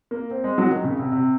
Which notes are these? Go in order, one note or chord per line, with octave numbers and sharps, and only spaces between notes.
A#3
C4
G#3
F#3
D#3
C#3
C3
C3